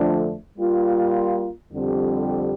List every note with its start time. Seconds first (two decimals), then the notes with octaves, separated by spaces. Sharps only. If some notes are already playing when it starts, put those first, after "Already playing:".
Already playing: F2 D3 F3 A3 D4
0.57 G3 A#3 F4
1.72 F2 D3 G3 C4 G4